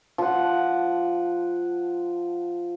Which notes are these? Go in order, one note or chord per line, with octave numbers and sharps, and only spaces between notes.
F3 F#5